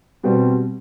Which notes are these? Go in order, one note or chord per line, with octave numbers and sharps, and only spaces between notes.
B2 G3 C4